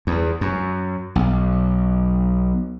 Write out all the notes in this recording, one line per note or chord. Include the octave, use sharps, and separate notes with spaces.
E2
F#2
B1